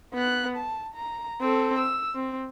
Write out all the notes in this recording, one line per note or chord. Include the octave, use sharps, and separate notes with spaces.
B3 F#6
A5
A#5
C4 A4
E6
C4